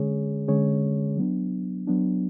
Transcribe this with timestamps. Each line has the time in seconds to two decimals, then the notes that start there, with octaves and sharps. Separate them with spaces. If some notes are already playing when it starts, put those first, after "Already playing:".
Already playing: D3 G#3 C#4 G#4 C#5
0.48 D3 G#3 C#4 G#4 C#5
1.17 F#3 B3 D4
1.87 F#3 B3 D4